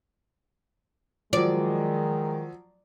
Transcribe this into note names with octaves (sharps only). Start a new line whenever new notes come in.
D#3 F3 F#3 G#3 D5